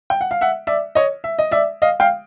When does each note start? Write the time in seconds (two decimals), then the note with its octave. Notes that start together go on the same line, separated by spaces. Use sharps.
0.10 G5
0.21 F#5
0.31 F5
0.41 E5 F#5
0.67 D5 E5
0.95 C#5 D#5
1.24 E5
1.39 D#5
1.51 D5 E5
1.82 D#5 F5
2.00 F5 G5